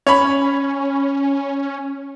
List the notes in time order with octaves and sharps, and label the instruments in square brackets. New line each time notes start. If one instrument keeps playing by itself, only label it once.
[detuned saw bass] C#4 [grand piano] C#5 B5